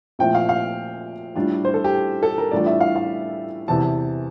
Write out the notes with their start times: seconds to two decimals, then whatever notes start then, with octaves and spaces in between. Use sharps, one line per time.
0.19 A#2 F3 A3 C4 E4 G5
0.35 F5
0.49 F5
1.36 A2 G3 D4 F4
1.65 C5
1.74 A4
1.85 G4
2.23 A4
2.38 A#4
2.51 A2 E3 G3 D4 F4 D5
2.66 E5
2.81 F5
2.96 F5
3.68 E2 C3 E3 A5